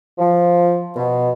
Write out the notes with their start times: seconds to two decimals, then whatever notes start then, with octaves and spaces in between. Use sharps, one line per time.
0.19 F3
0.96 B2